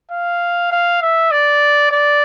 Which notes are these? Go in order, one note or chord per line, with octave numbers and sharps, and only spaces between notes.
F5
F5
E5
D5
D5